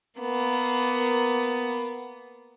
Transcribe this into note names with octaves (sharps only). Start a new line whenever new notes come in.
A#3 B3